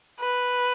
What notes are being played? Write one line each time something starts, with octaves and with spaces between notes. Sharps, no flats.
B4